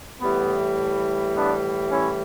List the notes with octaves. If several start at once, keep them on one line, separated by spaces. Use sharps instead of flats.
A2 E3 G3 B3
B3 D4
C#4 E4